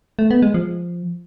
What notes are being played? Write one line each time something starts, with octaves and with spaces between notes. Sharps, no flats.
A3
B3
G#3
F3